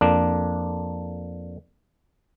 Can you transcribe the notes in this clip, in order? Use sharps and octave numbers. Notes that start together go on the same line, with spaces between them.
F2 A#3 D4